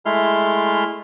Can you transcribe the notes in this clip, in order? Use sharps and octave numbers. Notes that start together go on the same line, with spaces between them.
G#3 A3 E4 C6 F6